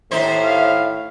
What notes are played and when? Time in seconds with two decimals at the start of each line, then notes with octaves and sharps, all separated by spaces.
0.11 D#2 A2 D#4 C5 E5
0.43 F5